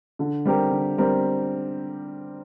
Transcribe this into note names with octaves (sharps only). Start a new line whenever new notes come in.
D3
G3 C4 G4 A#4
D3
G3 C4 G4 A#4